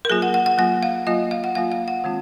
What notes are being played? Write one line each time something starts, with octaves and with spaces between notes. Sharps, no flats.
A#4
F#3 A#3 F4 G#4
F#5
F#5
F#5
F#3 A#3 F4 F#5
F5
F#3 A#3 F4 D#5
F5
F#5
F#3 A#3 F4 F5
F5
F#5
D#3 G#3 C4 F4